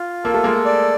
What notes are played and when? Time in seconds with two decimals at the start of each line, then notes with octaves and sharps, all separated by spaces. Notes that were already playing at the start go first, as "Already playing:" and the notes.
Already playing: F4
0.24 A#3 A4
0.34 A3
0.44 G#3 A#3
0.66 D5